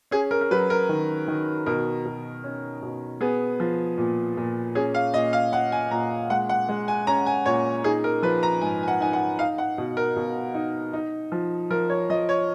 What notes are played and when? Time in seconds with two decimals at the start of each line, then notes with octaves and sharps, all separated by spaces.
0.11 C#4 G#4
0.31 A#4
0.41 A#4
0.51 F#3 B4
0.70 A#4
0.89 D#3
1.28 D#3
1.66 B2 A#4
2.05 B2
2.44 C#4
2.82 B2
3.21 B3 G#4
3.60 F3
3.98 A#2
4.37 A#2
4.75 C#4 G#4
4.94 F5
5.14 A#2 D#5
5.33 F5
5.53 C#4 F#5
5.72 G#5
5.91 A#2 A#5
6.30 G#3 F#5
6.49 F#5
6.69 G#3
6.88 G#5
7.07 C#4 A#5
7.26 G#5
7.46 A#2 C#5
7.84 D#4 G#4
8.04 A#4
8.22 F3 B4
8.43 A#5
8.61 G#2 G#5
8.83 G#5
8.88 F#5
9.01 D#4 G#5
9.13 F#5
9.39 D#4 F5
9.58 F#5
9.78 B2
9.97 A#4
10.16 B2
10.55 D#4
10.93 D#4
11.32 F3
11.70 F3 A#4
11.90 C#5
12.10 F3 D#5
12.29 C#5